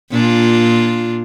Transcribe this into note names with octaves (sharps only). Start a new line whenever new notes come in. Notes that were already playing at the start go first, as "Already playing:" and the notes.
A#2 D4 F4